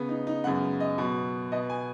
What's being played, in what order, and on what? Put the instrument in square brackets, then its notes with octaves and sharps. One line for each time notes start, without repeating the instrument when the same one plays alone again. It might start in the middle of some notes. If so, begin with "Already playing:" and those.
Already playing: [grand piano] C#3 B3
D#4
D#4
F#2 C#3 G#3 B3 F#5
D#5
B2 F#3 B3
B2 B3 D#5
G#5